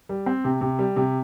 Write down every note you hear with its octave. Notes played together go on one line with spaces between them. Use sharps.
G3
C4
C3
C3
G3
C3